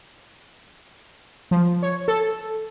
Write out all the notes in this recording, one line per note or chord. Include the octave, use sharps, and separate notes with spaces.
F3
C#5
A4